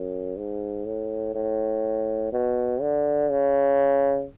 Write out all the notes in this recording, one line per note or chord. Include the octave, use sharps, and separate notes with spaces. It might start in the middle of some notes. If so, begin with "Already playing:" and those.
Already playing: F#2
G#2
A2
A2
B2
D3
C#3